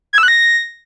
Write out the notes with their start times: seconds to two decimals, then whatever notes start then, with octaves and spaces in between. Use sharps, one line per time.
0.13 G#6
0.18 E6
0.23 F#6
0.28 A#6